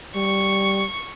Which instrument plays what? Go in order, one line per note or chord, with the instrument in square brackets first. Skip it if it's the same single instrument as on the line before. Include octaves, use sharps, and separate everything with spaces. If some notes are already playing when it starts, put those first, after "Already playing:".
[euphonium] G3 [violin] C#6